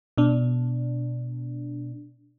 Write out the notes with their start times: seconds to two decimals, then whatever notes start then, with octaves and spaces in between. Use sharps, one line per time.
0.18 B2 D4